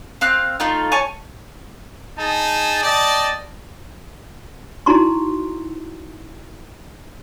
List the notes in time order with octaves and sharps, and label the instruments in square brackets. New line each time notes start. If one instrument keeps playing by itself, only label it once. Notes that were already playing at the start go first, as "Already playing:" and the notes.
[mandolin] C4 F5 F#6
A3 D#4 F4
C#5 G#5 A5 C#6
[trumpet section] D#4 G#4 A5
D5 D#5 G5 A5
[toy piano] D#4 E4 F#4 A#5 C6 C#6